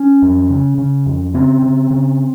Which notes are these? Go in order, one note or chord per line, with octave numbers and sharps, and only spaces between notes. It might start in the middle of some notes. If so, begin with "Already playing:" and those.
Already playing: C#4
F2
C#3
C#3
F2
C#3 C4
C#3
C#3